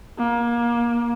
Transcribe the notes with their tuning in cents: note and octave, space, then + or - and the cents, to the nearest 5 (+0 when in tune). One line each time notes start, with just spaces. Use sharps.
A#3 +25